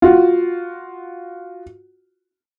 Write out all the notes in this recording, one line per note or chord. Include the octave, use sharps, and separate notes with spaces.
F4 F#4